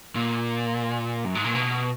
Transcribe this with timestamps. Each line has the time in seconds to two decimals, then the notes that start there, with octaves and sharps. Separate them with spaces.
0.15 A#2
1.25 F#2
1.35 G#2
1.45 A#2
1.55 B2